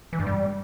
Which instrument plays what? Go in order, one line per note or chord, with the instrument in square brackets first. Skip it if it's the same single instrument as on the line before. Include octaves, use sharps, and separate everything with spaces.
[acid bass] E3
G2
G3